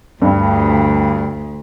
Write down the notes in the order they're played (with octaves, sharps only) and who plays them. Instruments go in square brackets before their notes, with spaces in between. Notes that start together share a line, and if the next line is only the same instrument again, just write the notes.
[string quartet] D2 [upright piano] G2